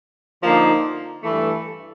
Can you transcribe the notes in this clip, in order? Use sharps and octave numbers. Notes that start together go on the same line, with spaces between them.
D3 F3 A#3 D#4
G2 E3 A3